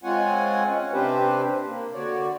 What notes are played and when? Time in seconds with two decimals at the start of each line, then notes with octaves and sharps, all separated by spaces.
0.04 G#3 C4 F4 C#5 F#5 G#5
0.68 C#4
0.93 C3 C4 D4 G4 B4 C5
1.66 A#3
1.94 D3 F#4 C#5 D5